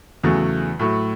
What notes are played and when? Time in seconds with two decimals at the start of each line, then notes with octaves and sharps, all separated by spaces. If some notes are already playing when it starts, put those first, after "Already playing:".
0.24 E2 C#3 F#3 A3
0.79 A2 F#3 A3